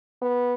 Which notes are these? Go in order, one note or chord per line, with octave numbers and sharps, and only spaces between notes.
B3